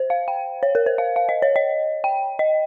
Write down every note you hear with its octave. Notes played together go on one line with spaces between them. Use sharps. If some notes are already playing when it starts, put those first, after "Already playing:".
Already playing: C5
F5
G5
C#5
A#4
C5
F5
F5
D#5
C#5
D#5
G5
D#5